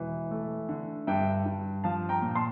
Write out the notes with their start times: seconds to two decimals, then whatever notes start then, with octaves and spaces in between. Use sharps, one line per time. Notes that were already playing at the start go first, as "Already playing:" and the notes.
Already playing: E1 E3
0.31 A3
0.69 D3
1.07 G2 E5 G5
1.46 G2
1.84 F3 F5 A5
2.09 G5 A#5
2.22 A#2
2.35 A5 C6